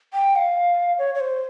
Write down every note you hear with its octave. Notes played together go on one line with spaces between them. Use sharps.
G5
F5
C#5
C#5
C5